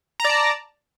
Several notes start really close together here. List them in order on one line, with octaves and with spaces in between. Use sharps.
A#5 D5 A5